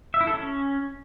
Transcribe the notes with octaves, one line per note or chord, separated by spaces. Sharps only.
E5
E4
A4
C#4